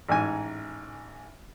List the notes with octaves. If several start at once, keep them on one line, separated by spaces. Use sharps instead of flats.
A1 G#2 G#5